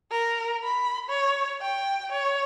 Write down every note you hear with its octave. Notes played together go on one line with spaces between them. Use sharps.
A#4
B5
C#5
G5
C#5